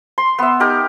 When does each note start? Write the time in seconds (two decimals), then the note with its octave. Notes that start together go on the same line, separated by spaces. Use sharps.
0.18 C6
0.39 B3 E5
0.60 D#4 G4 A#4